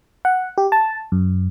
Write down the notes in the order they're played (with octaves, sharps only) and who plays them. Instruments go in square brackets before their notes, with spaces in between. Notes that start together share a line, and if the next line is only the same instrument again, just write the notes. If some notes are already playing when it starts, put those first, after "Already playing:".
[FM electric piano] F#5
G4
A5
F#2